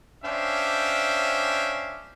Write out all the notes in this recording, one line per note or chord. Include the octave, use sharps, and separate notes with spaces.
C#4 D4 C5 E5 F5 G5